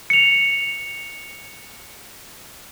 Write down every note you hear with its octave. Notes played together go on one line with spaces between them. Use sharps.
C#7 F7